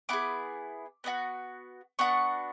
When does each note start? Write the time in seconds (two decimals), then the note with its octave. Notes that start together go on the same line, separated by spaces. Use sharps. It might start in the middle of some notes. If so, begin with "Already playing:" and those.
0.09 B3 E4 G#4 D6
1.04 B3 D4 F#4
1.99 B3 D4 F#4 C#6